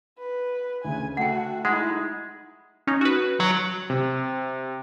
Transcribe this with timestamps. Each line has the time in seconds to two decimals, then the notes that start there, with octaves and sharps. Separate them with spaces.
0.19 B4
0.85 D2 C#3 G#5
1.17 A3 F#4 F#5 G5
1.65 G#3 D#4 E4 F#5
2.87 C#4 D#4
3.01 F#4 B4
3.40 F#3
3.90 C3